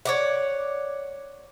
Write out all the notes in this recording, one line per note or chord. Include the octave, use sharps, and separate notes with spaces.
C#5 D5 F#5